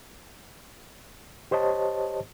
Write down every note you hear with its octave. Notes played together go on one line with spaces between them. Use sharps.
G4 C5 C#5 D#5 A5